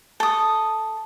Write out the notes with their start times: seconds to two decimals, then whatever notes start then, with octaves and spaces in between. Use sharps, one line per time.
0.20 A4 D#6